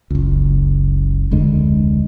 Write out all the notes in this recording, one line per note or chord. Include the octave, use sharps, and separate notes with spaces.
F#1 C#2
F1 D2 D3 G#3